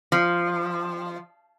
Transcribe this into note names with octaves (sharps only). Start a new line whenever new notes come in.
F3